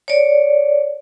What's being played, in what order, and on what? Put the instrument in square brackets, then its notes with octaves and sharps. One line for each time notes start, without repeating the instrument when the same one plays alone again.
[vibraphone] C#5 D5